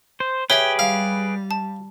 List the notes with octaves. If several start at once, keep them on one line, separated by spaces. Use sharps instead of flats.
C5
G4 G#4 B4 C#5 E5 G5 G#6
G3 F5
A5